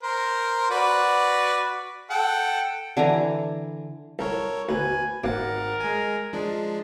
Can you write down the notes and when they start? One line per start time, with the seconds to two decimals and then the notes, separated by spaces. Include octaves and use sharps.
0.03 A#4 C5
0.71 F#4 B4 D5
2.10 A4 F#5 G5
2.97 D3 E3 G#5 A#5
4.19 C2 A4 A#4 C#5
4.69 D2 B2 B4 G#5
5.24 G#1 B2 A#3 C4 A#4 F#5 A6
5.80 G#3 G#5
6.33 F3 G#3 D4